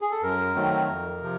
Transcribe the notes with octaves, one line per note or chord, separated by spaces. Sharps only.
G#4
A4
F#2 A#4
D#3 F#3 A3 C4
F2
C3 F3